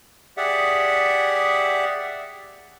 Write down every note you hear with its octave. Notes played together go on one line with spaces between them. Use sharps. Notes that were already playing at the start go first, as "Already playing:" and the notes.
G4 G#4 D5 E5 F#5